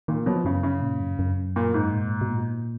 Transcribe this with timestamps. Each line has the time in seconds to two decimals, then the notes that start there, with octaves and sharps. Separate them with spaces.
0.08 A#2 D#3
0.26 B2 F#3
0.36 F3
0.45 F#2 C#3
0.63 C#3
0.82 A#2
1.00 F#2
1.19 F#2
1.56 A#2
1.74 G#2
1.92 A#2
2.21 B2
2.30 A#2